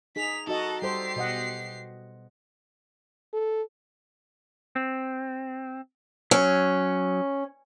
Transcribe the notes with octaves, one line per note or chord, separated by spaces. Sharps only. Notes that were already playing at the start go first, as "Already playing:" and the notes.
D#4 G#4 B6 F7
D#4 F#4 A4 D#5 F#5
G3 G4 A4 C5 C7
B2 D#5 F#5
A4
C4
F#3 C#4